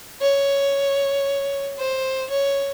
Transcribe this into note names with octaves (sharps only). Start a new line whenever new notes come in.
C#5
C5
C#5